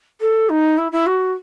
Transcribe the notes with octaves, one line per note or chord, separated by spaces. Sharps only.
A4
D#4
E4
E4
F#4